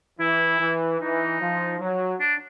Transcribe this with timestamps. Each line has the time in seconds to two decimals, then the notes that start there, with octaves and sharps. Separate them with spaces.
0.20 E3 E4
0.60 E3
1.00 E3 D#4
1.40 F3
1.80 F#3
2.20 D4